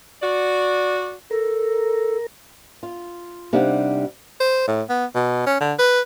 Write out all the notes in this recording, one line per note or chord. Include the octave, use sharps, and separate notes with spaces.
F#4 D5
A4 A#4
F4
C3 G3 D4 D#4 F5 F#5
C5
A2
B3
B2
C#4
D3
B4